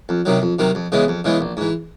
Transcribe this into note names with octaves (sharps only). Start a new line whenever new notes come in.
F2
C3 D#3 F#3
F2
C3 D#3 F#3
F2
C#3 E3 G#3 B3
F2
C#3 E3 G#3 B3
A#1
G#2 E3